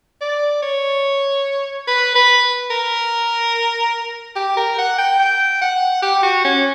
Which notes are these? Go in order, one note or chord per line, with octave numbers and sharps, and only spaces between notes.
D5
C#5
B4
B4
A#4
G4
A#4
F#5
G5
G5
F#5
G4
F#4
C#4